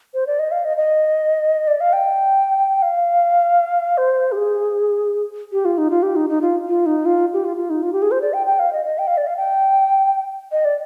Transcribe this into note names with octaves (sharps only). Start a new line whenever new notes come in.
C5
D5
D#5
F5
D#5
D#5
D5
F5
G5
F5
C5
G4
G#4
G4
F4
D#4
F4
G4
D#4
D#4
F4
F4
D#4
F4
G4
F4
F4
D#4
F4
G4
G#4
C5
D5
G5
G5
F5
D#5
D#5
G5
F5
D5
F5
G5
D#5
D5